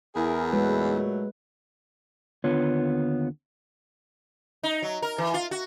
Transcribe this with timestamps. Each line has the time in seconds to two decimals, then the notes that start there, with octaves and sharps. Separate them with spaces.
0.16 E2 E4 G#4 A#4
0.53 A#2 F#3 G#3 A3 B4
2.44 D#2 D3 B3 F4 C#5
4.63 D#4
4.82 F#3
5.02 A#4
5.18 E3
5.34 F4
5.51 F#4